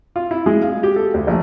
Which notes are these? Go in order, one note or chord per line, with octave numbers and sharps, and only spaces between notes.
F4
E4
G#3
F5
G4
A4
D2
A#1